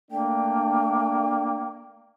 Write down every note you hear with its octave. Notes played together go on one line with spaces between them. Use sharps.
A3 A#3 D4 G5